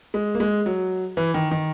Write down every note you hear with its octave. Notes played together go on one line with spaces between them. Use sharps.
G#3
A#3
G#3
F#3
E3
D#3
D#3